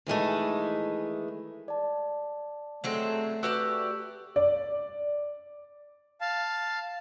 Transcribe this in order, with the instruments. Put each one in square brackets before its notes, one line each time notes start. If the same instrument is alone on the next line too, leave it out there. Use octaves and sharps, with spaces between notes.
[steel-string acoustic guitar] D#3 E3 G#3 A3
[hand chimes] D5 A5
[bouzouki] F#3 G#3 C4 [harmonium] A3
[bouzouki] F#4 G4 D5 [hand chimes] B4 E6 F#6
[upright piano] D5
[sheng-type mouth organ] F5 A5